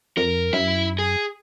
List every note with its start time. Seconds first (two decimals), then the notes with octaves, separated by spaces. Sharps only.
0.18 F2 A#4
0.53 F#2 E4 E5
0.99 G#4